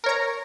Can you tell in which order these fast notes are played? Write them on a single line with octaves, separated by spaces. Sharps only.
A#4 C#5 A#5